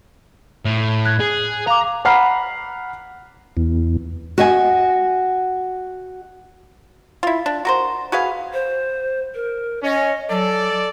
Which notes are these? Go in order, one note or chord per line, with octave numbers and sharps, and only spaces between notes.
A2
F#6 G#6
G#4
F5 A#5 D6
F#5 A#5 B5 F6 C7
E2
F#4 D#5 G#5
E4 F4
D4
F#4 A#4 C5
F#4 G#4 B4 F5
C5
A#4
C#4 D#5
F#3 A4 D5